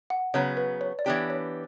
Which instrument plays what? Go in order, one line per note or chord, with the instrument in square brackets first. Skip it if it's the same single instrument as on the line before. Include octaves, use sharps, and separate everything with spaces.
[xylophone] F#5
[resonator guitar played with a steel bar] C#3 F#3 B3 [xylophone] C#5
[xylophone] B4
C#5
D5
[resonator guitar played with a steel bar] E3 B3 D4 G4 [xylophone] C#5
[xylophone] C#5